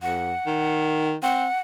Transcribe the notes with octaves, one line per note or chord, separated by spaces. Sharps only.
F2 F#5
D#3
C4 F#5